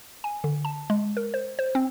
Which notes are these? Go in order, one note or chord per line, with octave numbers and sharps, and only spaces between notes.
G#5
D3
A5
G#3
A#4
C5
C5
C4